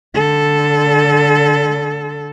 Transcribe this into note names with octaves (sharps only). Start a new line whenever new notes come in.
D3 A4